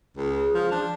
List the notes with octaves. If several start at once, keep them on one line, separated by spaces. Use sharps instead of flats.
C#2 G#4
F3
F3 D4